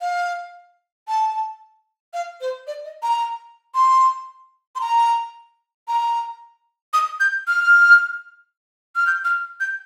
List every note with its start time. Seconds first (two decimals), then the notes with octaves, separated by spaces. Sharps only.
0.01 F5
1.08 A5
2.14 F5
2.41 C5
2.67 D5
2.85 D#5
3.03 A#5
3.74 C6
4.76 C6
4.80 A#5
5.88 A#5
6.93 D#6
7.20 G6
7.47 F6
8.96 F6
9.07 G6
9.25 F6
9.60 G6